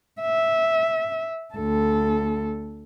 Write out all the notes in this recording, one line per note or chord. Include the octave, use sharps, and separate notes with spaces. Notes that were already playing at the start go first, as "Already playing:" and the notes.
E5
D2 A4